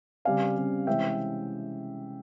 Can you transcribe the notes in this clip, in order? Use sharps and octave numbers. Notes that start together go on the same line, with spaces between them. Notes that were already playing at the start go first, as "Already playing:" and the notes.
C#3 G3 C4 F5 G#5
C#3 G3 C4
C3 E3 G#3 C#4 E5 G5